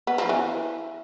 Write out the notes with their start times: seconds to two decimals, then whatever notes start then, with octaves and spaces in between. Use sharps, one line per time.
0.07 B3
0.18 F3
0.29 E3